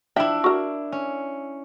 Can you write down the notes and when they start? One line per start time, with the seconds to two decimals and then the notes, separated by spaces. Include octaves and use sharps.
0.16 F3 D4 E4 E5 G5
0.44 F#4 A#4
0.92 C#4